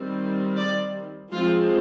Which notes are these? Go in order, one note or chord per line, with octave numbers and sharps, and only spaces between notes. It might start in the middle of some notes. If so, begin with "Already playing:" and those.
Already playing: D#3 G3 C4
D5
F3 G#3 C4 F4